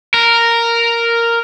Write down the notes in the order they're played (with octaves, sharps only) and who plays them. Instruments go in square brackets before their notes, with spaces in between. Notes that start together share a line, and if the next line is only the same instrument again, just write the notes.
[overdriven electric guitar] A#4